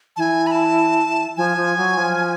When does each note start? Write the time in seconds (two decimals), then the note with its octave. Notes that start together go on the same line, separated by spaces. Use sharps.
0.16 E3 G#5 A5
0.47 B5
0.52 A5
1.37 F3 G#5
1.57 F3
1.77 F#3
1.97 F3